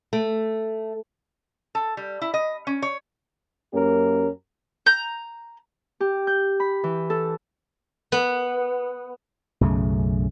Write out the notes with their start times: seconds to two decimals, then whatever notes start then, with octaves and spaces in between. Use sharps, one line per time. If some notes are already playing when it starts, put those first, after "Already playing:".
0.13 A3
1.75 A4
1.97 G3
2.21 E4
2.34 D#5
2.67 C#4
2.82 C#5
3.74 F#2 A#3 C#4 G4 A#4
4.86 A#5 G6
6.00 G4
6.27 G6
6.60 B5
6.84 E3
7.10 A4
8.12 B3
9.61 B1 F#2 C#3 A3